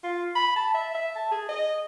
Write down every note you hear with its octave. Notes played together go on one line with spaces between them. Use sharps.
F4
B5
A5
E5
E5
A5
G#4
D#5